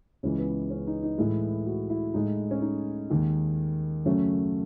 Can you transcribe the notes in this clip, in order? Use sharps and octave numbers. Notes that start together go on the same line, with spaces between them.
C#2 C#3 E3 G#3 C#4
B3
C#4
D#4
D#4
A2 E3 G#3 E4
F#4
E4
A2 G#3 D#4
C#4
D#4
D#2 D#3 G#3
F#2 C#3 F#3 A3 C#4